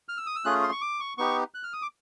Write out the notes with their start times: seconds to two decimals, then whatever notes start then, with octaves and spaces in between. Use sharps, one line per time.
0.09 F6
0.17 E6
0.27 D#6
0.36 E6
0.45 A3 C#4 F4 G#4 F#6
0.63 C6
0.72 C#6
0.81 D6
1.00 C#6
1.18 B3 D#4 G4 C#6
1.54 F#6
1.63 F6
1.73 D#6
1.82 D6